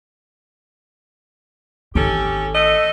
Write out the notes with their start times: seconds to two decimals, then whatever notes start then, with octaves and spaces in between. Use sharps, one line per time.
1.95 G#1 D#3 C#4 G4 A4
2.54 A3 A4 D#5